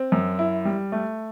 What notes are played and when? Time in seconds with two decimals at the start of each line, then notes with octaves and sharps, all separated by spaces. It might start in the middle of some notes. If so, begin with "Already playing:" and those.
Already playing: C4
0.12 F#2
0.39 E4
0.65 G3
0.92 A3